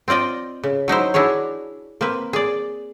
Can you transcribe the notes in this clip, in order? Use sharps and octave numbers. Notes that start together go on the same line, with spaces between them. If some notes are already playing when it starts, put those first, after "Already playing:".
C4 F4 D5 D#5 G5
C#3
F#3 D#4 E4 C5
D4 E4 F#4 G#4 C#5
A#3 C4 B4
G#4 D5